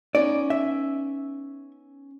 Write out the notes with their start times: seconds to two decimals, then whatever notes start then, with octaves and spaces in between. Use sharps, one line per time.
0.15 B3 C#4 D#4 D5
0.50 E5